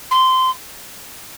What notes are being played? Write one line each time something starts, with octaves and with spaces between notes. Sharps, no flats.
C6